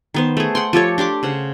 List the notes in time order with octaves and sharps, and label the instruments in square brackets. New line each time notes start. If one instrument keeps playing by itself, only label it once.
[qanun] D#3 B3 C5
A3 G#4
F#5 G5 C6
F3 G4 A4 C#5
D4 G4 C6 D6
C#3 C5 F#5